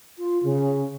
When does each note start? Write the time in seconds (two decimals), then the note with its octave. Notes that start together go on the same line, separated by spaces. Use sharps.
0.18 F4
0.43 C#3